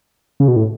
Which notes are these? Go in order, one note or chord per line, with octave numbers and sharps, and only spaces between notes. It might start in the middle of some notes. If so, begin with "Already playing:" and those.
C#3
B2
A2